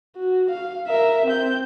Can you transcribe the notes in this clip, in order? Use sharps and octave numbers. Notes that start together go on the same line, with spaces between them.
F#4
F5
A#4 E5
C4 G6